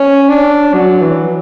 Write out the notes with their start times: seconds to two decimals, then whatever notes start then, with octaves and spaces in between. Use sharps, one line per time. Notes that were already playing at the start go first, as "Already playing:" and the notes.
Already playing: C#4
0.29 D4
0.73 F#3
1.02 E3